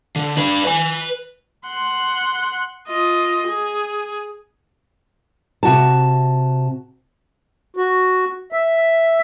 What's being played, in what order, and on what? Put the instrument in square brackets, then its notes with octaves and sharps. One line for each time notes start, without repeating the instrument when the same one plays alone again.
[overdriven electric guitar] D3
D4 B4
B4 G#5
[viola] F#5 C6
F4 D#5
G#4
[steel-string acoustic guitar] C3 F#4 A5
[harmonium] F#4
E5